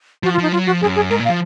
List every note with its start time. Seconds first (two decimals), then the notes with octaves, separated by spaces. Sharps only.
0.23 F3 F#4
0.34 F4
0.38 F3 D#4
0.52 F#3 F4
0.67 F3 F#4
0.81 F#2 G#4
0.96 G#4
1.10 G#2 A#4
1.20 A#2 F5
1.29 F3